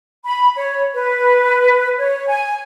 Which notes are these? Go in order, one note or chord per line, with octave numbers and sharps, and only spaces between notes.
B5
C#5
B4
C#5
G#5